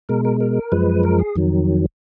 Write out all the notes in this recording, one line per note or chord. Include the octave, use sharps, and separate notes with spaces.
B2 G#3 A#4
A#4
A#4
F#2 F3 G#3 B4
A#4
G#4
F2 D#3 F#3